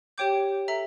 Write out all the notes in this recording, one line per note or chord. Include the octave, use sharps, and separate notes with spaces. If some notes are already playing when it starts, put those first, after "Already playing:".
G4 C#5 G5 D6 G6
A4 E5 A#5